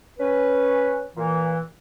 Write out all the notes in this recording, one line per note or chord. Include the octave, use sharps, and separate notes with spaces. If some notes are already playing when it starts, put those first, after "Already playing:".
C#4 B4
A#2 E3